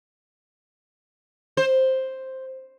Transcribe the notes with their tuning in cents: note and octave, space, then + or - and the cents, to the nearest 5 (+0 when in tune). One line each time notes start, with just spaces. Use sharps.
C5 +5